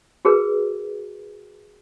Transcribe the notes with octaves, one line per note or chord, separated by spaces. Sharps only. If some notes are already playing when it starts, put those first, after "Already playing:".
F#4 G#4 A#4 B4